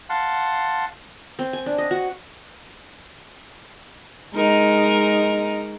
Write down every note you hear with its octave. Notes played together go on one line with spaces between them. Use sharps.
F5 F#5 A5 C6
C4
G#5
D4
D#5
F#4
G#3 D#4 A#4